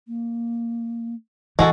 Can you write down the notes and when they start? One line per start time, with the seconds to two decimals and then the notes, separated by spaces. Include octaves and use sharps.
0.08 A#3
1.59 E3 G#3 F#4 A4